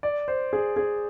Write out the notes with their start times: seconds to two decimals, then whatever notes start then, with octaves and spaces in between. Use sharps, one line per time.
0.03 D5
0.28 C5
0.53 G#4
0.76 G#4